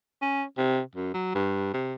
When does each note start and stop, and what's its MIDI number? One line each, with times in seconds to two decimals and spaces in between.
0.22 0.44 61
0.58 0.80 48
0.95 1.11 42
1.14 1.33 54
1.35 1.70 43
1.74 1.94 48